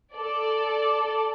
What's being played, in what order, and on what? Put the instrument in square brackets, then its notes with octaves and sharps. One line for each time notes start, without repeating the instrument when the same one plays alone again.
[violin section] A4 D5